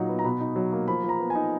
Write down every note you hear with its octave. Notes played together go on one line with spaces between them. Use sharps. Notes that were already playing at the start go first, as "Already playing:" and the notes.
Already playing: A#2 F#3 D#4 F#5
B3
A#5
B2 B5
D#4
F#3
A#3
F3 B5
F3
A#5
B3
D#4 G#5